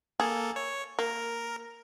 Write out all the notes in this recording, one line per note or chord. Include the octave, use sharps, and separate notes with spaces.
A#3 G#4 A4
C#5
A#3 A#4